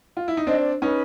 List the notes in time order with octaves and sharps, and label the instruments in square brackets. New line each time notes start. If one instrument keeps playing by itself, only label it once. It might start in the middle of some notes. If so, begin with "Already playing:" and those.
[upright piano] F4
E4
D#4
[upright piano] C4 D4 [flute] D#5
[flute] D5
[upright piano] C#4 D#4 [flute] B4